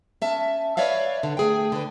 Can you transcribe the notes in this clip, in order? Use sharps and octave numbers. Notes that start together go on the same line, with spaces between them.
C#4 E5 A5
B4 C#5 D5 E5 F5
D3
A3 G#4 G5
D3 B4